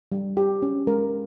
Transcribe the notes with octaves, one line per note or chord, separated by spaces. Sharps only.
G3
G4
C#4
G#3 A#4